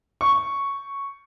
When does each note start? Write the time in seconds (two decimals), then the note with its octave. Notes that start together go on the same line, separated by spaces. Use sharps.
0.21 C#6